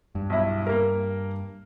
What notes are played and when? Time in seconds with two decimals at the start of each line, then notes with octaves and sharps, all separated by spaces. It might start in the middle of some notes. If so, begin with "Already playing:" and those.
0.15 G2
0.30 B1 E4
0.67 A#3 A#4